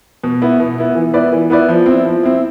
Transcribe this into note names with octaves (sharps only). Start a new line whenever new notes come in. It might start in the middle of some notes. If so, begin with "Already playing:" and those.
B2
B3 E4
B2
B3 E4
E3
B3 E4 B4 D5
E3
B3 E4 B4 D5
F3
C4 E4
F3
C4 E4